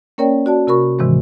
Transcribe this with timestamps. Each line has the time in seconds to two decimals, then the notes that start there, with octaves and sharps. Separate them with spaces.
0.18 A#3 C#4 A#4 C#5 D5 G5
0.46 F#4 D5 A5
0.67 C3 F#4 A#4 B5 C#6
0.99 G#2 C3 D#3 E3 G#3